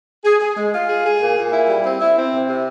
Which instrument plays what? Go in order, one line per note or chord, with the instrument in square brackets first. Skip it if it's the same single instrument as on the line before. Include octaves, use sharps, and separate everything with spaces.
[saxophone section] G#4
G#4
G#3
F4
G#4
G#4
A#2
A#2
E4
G3
C4
E4
C4
C3
C3